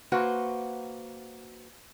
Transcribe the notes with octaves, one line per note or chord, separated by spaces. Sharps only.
A#3 F#4 B4 C5 F#5